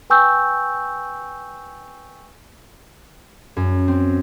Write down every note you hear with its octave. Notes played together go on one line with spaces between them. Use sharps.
B4 G5 G#5 C#6 E6 G6
F#2
C4